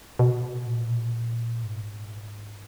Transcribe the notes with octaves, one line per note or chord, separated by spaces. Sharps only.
B2
A#2
G#2